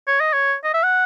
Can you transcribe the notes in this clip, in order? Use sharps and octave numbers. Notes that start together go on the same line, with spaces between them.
C#5
D#5
C#5
D#5
E5
F#5